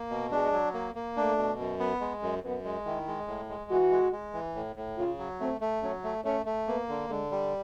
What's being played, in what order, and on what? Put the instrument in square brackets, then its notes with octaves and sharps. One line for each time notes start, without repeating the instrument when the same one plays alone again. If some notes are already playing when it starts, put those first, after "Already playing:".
Already playing: [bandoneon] A#3
B2
[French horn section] G#3 [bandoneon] D4
[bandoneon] F#3
A#3
A#3
[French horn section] A3 [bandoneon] D4
[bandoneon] B2
F#2
B3
G#3
F#2
[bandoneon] F#2 [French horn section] B3
[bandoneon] G#3
[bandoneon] D#3 [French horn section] E4
[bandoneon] G#3
A2
G#3
[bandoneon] E3 [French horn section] F#4
[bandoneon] G#3
G#3
E3
A2
A2
[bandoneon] C#3 [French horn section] F4
[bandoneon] F#3
[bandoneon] A3 [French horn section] C4
[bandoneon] A3
[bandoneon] F#3 [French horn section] C#4
[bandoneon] A3
[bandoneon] A3 [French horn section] C#4
[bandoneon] A3
[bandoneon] A#3 [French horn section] B3
[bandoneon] D3
[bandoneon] D3 [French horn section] G#3
[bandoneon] G3